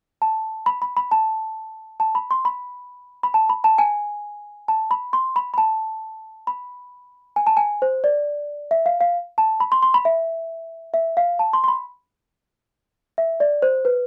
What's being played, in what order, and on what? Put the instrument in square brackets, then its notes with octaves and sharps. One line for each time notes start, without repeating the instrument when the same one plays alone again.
[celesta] A5
B5
B5
B5
A5
A5
B5
C6
B5
B5
A5
B5
A5
G#5
A5
B5
C6
B5
B5
A5
B5
G#5
A5
G#5
C5
D5
E5
F5
F5
A5
B5
C6
C6
B5
E5
E5
F5
A5
C6
C6
B5
E5
D5
C5
B4